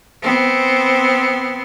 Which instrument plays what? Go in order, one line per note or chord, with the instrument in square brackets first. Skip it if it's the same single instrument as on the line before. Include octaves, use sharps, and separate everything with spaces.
[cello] B3 C4